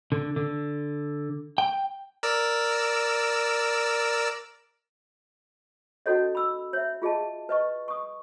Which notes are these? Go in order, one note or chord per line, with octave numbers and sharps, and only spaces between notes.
D3
D3
G5
A#4 D5 E6
C#4 D#4 F#4 A4 C#5 D#5
B5 E6
C#5 E5
F4 G#4 D#5 A5
B4 D#5 C#6
C#6 D#6